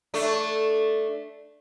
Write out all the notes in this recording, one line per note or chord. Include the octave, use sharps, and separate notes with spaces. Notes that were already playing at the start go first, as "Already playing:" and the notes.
A3 D4